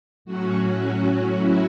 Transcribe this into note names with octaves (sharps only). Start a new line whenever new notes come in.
A2 F#3 C#4 F#4
F#4
E4